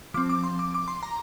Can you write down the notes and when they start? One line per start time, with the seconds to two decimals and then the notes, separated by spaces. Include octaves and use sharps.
0.14 F3 C4 D6
0.29 D6
0.44 C6
0.59 D6
0.74 D6
0.88 C6
1.03 A#5